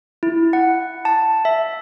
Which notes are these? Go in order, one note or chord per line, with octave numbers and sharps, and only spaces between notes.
E4
F#5
A5
E5